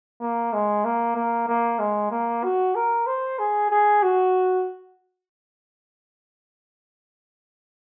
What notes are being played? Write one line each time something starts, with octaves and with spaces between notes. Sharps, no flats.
A#3
G#3
A#3
A#3
A#3
G#3
A#3
F#4
A#4
C5
G#4
G#4
F#4